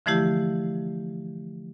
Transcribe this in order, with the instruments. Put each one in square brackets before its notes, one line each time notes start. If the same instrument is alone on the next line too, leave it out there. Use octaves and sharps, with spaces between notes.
[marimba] D3 E3 F3 A3 E4 G4